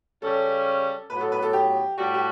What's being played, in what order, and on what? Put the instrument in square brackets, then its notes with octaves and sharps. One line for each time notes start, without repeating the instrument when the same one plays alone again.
[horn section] C#3 G3 C#4 [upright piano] A4
[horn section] A2 F#3 B3 [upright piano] B4
[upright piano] A4
B4
A4
G4
[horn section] A2 G3 D4 F#4 [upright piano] G4
[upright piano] G4